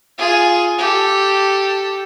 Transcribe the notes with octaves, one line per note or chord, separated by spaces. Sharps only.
F4 G#4
G4 A4